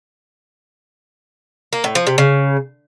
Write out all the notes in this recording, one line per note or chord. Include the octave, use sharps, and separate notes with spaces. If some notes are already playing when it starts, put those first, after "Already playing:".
A#3
A2
F3
C3
C#3